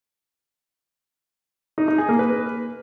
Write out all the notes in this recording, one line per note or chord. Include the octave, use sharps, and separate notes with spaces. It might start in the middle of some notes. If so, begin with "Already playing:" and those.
D#4
D#4
G#4
A#3
B4